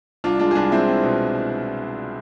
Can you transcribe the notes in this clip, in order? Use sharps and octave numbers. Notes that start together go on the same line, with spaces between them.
C2 D4 F4
G#3 D4 F4
G#4
C2 D4 F4
G#3 C4 E4
C4
B2